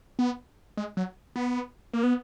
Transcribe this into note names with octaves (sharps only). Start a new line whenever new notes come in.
B3
G#3
F#3
B3
A#3
B3